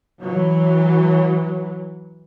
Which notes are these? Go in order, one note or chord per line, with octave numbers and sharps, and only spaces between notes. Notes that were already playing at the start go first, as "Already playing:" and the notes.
E3 F#3